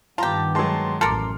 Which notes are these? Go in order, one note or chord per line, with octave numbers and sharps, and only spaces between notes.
G2 D#3 B3 F4 G4 A5 A#5
F#3 G#3 A5 C6
A1 F#2 A4 A#4 C6 D6 F6